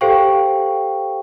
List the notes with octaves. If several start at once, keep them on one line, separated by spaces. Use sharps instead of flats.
G4 A4 C5 F5 G5 C#6